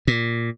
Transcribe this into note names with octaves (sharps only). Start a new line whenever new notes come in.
A#2